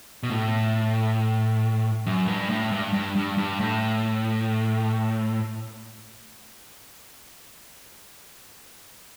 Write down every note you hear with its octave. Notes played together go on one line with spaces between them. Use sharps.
B2
A2
F#2
G2
A2
G2
G2
G2
G2
A2